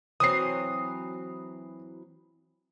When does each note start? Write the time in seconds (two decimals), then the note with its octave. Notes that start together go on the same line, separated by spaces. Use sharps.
0.20 E3 F#3 C4 D#6 C7